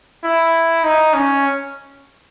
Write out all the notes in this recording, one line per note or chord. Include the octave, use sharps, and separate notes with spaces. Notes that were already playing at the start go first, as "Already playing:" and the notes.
E4
D#4
C#4